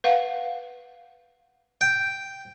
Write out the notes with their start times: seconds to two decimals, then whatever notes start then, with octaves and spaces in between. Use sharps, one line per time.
0.04 B4 F5 F#5
1.81 G5